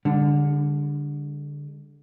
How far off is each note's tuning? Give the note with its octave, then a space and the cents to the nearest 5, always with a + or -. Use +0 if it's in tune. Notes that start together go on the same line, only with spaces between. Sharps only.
D3 -10 G3 +45